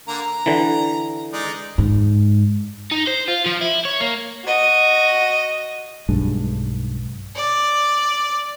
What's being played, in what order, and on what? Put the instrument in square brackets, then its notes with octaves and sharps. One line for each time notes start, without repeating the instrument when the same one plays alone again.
[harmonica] D3 A#3 A#5
A#5
[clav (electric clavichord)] D3 E3
[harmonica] G#3 D#4 D5
[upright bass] G#2
[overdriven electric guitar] D#4
C5
F4
F3
E4
C#5
A#3
[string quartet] F#4 D#5
[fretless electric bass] B1 G2 G#3 D4
[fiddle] D5